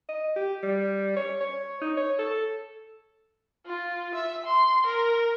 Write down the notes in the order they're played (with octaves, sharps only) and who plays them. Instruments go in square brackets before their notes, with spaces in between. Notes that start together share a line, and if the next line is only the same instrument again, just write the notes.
[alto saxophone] D#5
G4
G3
C#5
C#5
D#4
C#5
A4
[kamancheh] F4
E5
C6
A#4